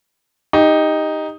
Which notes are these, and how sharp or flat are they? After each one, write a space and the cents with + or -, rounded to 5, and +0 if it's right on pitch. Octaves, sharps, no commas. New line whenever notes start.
D#4 +0 G4 +20